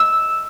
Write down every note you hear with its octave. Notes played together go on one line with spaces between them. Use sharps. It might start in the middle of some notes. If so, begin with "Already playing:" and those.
Already playing: E6